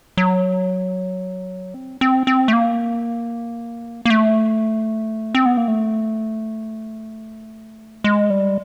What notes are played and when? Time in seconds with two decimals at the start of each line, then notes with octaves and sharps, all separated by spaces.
0.17 F#3
1.74 C4
2.01 C4
2.27 C4
2.48 A3
2.53 A#3
4.05 A#3
4.10 A3
5.35 C4
5.46 B3
5.57 A#3
5.68 A3
8.04 G#3
8.30 G3